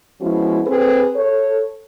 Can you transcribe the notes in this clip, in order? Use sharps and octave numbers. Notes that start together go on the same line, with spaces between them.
F3 G#3 B3 C#4 E4 F#4
C4 G#4 A4 B4
A4 C#5